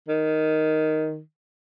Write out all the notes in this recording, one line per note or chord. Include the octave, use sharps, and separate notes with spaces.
D#3